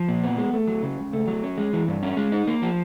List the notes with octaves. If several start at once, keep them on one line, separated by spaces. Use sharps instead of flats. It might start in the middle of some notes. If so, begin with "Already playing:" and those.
Already playing: F3
A#2
B3
G#3
A3
F#3
C#3
C#2
A3
F#3
C#4
G#3
E3
G2
C#4
G#3
D#4
A#3
F3